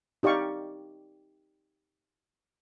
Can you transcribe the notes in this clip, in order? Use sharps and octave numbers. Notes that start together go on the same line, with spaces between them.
D#4 G4 D5 F5 C#6